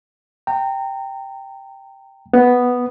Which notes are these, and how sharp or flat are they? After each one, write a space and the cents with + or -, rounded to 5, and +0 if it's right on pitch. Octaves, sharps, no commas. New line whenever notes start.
G5 +0 A#5 -30
B3 +0 B4 +0